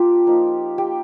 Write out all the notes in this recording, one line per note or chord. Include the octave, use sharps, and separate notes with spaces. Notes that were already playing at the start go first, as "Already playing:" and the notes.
Already playing: A#3 D4 F4 G4
F3 A#3 D#4
G4